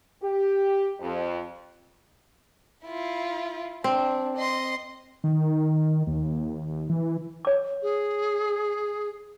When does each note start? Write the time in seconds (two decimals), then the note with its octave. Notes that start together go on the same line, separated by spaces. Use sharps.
0.21 G4
1.00 F2
2.85 E4 F4
3.84 C4 D4
4.37 D#5 C6
5.24 D#3
6.07 D#2
6.69 D#2
6.89 E3
7.45 C#5 D6
7.82 G#4